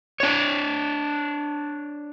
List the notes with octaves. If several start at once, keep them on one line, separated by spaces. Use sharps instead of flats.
D4 C#5